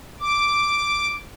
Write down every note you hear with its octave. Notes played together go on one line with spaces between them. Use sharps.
D6